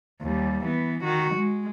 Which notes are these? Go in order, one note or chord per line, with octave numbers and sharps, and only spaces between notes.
D#2 G3
E3 B3
D#3 F#4
G#3